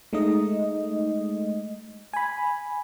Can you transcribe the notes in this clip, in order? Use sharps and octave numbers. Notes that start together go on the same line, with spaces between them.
G#3 A3 D#4 D#5
G#5 B5